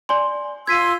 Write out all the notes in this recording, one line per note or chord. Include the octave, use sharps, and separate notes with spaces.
D5 G#5 C6
F4 C6 E6 G#6 B6 D#7